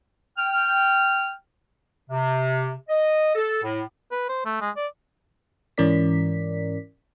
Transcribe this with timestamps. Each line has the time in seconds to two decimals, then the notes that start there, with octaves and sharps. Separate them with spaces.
0.38 G5 F6
2.10 C3
2.89 D#5
3.35 A4
3.63 A2
4.11 B4
4.29 C5
4.45 A3
4.61 G#3
4.77 D5
5.78 G#2 E3 C#4 A#4 D5 B6